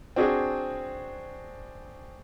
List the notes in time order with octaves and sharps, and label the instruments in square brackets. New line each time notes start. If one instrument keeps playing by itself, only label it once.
[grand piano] C4 D4 F#4 G#4